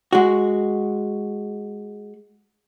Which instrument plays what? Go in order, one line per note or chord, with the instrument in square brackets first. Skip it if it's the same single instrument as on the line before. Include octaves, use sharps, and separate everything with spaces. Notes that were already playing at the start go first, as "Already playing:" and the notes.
[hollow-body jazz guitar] G#3 F#4